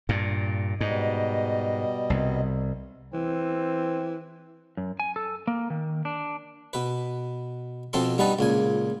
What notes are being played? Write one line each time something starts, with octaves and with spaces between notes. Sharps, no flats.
G2 A#2
G#2 B2 G3 D#5
C2
E3 C4
F#2
G#5
A4
A#3
D#3
D4
B2 B4
F2 B2 C4 A4 C6
G2 G3 B3 D#4 B4 A5
C#2 A#2 G#5